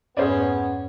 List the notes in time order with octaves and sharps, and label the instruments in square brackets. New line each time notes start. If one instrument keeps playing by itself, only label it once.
[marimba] F2 G#2 [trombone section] B3 [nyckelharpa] C#4 [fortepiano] G#4 C5 D5